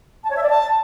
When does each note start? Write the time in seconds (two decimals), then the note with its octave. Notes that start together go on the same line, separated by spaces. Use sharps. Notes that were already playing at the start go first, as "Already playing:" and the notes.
0.23 A5
0.30 C#5
0.36 E5
0.43 D5
0.49 A5